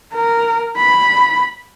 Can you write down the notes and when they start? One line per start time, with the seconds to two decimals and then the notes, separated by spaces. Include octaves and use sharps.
0.14 A#4
0.77 B5